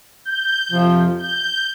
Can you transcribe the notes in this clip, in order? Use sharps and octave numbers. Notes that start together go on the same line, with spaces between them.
G6
F2 C3 F3
G6